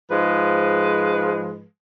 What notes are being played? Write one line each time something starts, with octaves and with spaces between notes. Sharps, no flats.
G#2 F3 G#3 B4